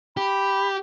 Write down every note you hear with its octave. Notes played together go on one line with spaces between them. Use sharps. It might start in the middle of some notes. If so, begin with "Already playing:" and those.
G4 B5